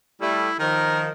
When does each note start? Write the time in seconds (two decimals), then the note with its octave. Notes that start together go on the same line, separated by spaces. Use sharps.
0.21 G3 A3 E4
0.60 D#3 F3 A#4